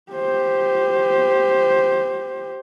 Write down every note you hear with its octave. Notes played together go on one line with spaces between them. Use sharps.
G4 C5